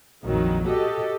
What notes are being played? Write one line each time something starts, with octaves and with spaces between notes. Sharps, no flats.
A#1 F2 D#3 F#3
F#4 G4 A4 D#5